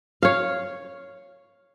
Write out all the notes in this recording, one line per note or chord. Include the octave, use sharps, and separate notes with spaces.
C#5 F5